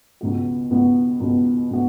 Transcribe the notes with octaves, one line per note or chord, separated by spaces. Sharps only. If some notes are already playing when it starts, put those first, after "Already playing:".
C#2 B2 B3 F#4
C#2 B2 B3 F#4
C#2 B2 B3 F#4
B2 B3 F#4